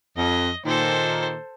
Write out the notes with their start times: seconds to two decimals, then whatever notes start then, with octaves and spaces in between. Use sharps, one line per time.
0.17 F2 D#5
0.65 A#2 D#3 A4 C5